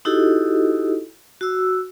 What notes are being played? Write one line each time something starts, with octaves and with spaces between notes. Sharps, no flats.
D#4 E4 F#4 G4 A4 D#5
F#4 E6